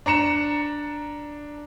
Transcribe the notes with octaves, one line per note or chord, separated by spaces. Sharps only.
D4 A#5 C#7 E7